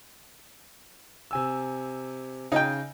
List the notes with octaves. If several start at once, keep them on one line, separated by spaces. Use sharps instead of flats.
C3 G#5 E6
C#3 D#4 G5